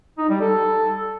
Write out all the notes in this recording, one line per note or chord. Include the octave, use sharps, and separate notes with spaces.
D#4
G3
A4